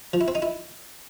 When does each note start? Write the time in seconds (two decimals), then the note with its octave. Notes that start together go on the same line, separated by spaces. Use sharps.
0.13 F3
0.21 E4
0.28 C4
0.35 D#4
0.42 E4